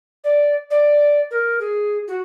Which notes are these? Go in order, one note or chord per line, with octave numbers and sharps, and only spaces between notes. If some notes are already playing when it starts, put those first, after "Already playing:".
D5
D5
A#4
G#4
F#4